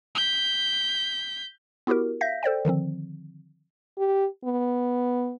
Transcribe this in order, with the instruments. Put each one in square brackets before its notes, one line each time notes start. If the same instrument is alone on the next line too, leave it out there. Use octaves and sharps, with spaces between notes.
[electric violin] G6 B6
[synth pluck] B3 E4 F#4 G4 A#4
E5 F5 G6 A#6 B6
A4 C5 D5 G5
D3 D#3 F3 C4
[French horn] G4
B3